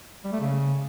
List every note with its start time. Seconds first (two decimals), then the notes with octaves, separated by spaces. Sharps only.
0.24 G3
0.32 A3
0.41 C#3